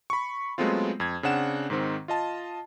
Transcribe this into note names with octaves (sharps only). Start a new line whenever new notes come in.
B5 C#6
F#3 G#3 A3 B3 C4 F4
F2 G#6
C#3 C4 D4 F#5 E7
G#2 D#3 C4
F4 D#5 A5